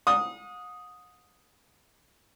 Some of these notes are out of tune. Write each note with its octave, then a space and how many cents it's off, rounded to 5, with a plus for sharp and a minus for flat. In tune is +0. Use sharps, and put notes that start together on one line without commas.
F#5 -45 D#6 +0